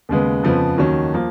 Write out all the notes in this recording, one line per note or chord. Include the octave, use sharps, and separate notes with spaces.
D#2 C#3 G#3 B3
F2 C#3 F3 B3
D#2 D#3 F#3 C#4
F3 A#3